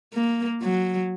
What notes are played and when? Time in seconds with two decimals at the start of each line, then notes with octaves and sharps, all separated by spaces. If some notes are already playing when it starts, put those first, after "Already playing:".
0.13 A#3
0.62 F#3